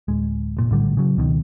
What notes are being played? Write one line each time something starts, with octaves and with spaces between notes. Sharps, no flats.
D1 G#3
F1 A#2
A#1 A2 D3 G3
C#3 F#3
C#2 B2 D#3